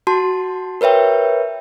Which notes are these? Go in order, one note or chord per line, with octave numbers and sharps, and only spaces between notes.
F#4 A5 C6
A#4 B4 C#5 E5 G5